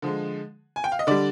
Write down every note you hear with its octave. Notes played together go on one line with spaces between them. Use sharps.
D3 F3 G#3
G#5
G5
F5
D#5
D3 G3 D5